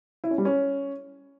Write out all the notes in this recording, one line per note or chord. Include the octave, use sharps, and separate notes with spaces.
E4
C#4
G3
C#4